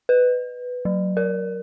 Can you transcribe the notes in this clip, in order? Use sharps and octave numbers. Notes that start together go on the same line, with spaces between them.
B4
F#3
A#4